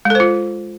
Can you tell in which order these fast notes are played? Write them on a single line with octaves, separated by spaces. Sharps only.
G#3 A4 C5 F4